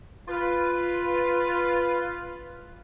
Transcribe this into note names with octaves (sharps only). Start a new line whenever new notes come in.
F4 B4